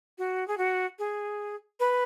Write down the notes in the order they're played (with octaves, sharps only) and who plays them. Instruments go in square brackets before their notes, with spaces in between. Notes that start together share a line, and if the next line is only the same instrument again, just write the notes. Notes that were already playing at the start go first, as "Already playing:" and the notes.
[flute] F#4
G#4
F#4
G#4
B4